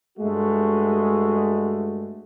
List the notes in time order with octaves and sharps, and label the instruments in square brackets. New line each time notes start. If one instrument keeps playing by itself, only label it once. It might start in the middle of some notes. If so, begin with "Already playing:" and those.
[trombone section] G2 G#3 A3 F#4